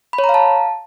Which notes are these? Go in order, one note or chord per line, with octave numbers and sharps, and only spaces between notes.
B5
C#5
A#5
F5
A5